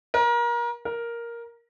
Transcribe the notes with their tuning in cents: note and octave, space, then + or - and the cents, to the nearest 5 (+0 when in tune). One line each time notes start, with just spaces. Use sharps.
A#4 +30
A#4 +5